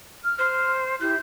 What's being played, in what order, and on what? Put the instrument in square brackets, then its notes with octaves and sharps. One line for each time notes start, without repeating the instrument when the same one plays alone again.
[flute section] F6
[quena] C5
[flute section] E4 G4 [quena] G6